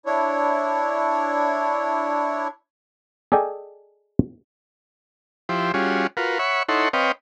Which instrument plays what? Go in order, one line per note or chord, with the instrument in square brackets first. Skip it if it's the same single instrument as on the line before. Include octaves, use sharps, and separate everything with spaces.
[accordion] D4 E4 C#5
[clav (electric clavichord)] G#4 A4 D5 D#5 G5 G#5
[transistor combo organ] F3 E4 G4 C5
G3 C#4 F4 F#4 G#4
F4 F#4 A#4 B4
C#5 E5 F#5 B5 C#6
D#4 E4 A4 C#5 F#5 C6
C4 B4 C#5 D#5 F5 G5